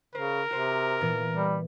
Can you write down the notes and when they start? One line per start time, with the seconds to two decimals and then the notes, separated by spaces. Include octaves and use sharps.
0.15 C#3 A#4 C5
0.51 C3 F#4 C5
1.01 A#2 E3 B3
1.34 G3